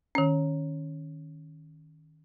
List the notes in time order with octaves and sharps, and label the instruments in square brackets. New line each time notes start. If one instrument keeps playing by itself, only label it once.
[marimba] D#3 C#4